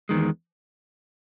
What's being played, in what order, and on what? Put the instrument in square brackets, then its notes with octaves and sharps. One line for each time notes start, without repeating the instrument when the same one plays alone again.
[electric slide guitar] E2 D#3 G#3